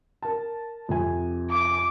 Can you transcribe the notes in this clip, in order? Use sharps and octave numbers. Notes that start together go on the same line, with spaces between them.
A#4 A5
F2 C3 G#5
D6